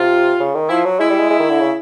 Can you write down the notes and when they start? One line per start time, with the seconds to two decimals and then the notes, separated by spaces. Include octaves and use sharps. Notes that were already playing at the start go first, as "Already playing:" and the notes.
Already playing: C3 F4
0.40 C#3
0.55 D#3
0.69 F3 E4
0.85 F#3
1.00 G#3 E4
1.10 G3
1.19 G#3
1.30 G#3
1.39 D#3
1.50 D3
1.60 C#3